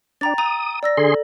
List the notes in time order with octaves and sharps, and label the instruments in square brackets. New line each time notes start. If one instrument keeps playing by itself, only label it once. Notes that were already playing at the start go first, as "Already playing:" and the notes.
[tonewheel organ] D4 [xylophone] G5 A#5 A6
[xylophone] A#5 [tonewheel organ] D#6
[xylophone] D5 E6 A#6
[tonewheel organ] D3 G#4 C6 [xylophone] A4